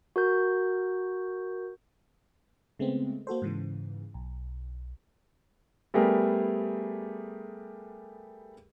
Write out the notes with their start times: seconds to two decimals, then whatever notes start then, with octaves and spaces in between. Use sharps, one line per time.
0.16 F#4 A#4 G6
2.79 C#3 G#3 A3 B3 C4
3.27 A#3 F#4 A4 C5
3.42 G#2 C#3 E3
4.14 B1
5.94 G3 A3 B3 G4 G#4 A#4